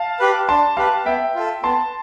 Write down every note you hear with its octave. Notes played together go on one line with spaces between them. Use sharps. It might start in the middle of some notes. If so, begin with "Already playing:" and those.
Already playing: F5 A5
G4 B4
D4 A5 C6
G4 B4 F5 A5
B3 E5 G5
F4 A4
B3 A5 C6